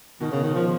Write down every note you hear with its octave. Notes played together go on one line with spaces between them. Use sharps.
B2 D#3
C#3
D#3
F3